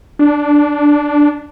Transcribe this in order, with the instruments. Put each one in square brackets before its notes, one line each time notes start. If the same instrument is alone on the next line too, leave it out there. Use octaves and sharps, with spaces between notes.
[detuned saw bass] D4